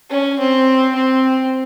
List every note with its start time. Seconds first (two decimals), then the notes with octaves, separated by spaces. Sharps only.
0.10 C#4
0.39 C4
0.95 C4